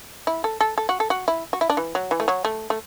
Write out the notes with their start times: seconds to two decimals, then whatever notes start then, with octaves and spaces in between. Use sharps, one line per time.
0.27 E4
0.44 A4
0.61 A4
0.78 A4
0.89 F#4
1.00 A4
1.10 F#4
1.28 E4
1.53 F#4
1.61 E4
1.70 D4
1.77 E3
1.95 F#3
2.11 E3
2.20 A3
2.28 F#3
2.45 A3
2.70 A3